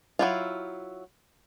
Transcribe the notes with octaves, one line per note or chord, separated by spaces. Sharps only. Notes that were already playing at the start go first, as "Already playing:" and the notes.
F#3 E4 F4